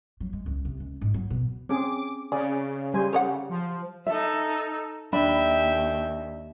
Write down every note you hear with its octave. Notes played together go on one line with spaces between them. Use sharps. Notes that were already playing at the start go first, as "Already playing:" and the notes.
F#3
G#3
C#2
C3
C#2
G#2
F#3
B2
C4 C#4 G#4 D6
C#3 G#4 D5
G3 C5 G#5
G4 C#5 D5 F#5
F3
D#4 A4 E5 E6
D#2 D4 E5 G5 B5